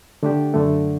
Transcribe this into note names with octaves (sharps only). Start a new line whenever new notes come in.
D3 A3 D4 G4
F#2 D3 A3